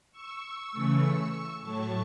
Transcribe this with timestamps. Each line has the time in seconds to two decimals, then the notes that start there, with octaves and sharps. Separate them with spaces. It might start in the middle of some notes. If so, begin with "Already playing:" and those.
0.11 C#6 E6
0.41 C#6 E6
0.72 C#3 E3 A3
1.60 A2 F#3 A3 A5 C#6